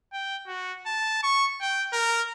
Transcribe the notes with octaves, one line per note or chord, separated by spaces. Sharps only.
G5
F#4
A5
C#6
G5
A#4